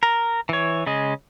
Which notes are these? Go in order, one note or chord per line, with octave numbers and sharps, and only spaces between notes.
A#4
E3 C#5
C#3 G#3 D#5